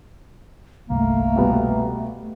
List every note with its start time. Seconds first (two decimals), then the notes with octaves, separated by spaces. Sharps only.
0.90 G1 C2 A3 A#3
1.36 B2 G3 B3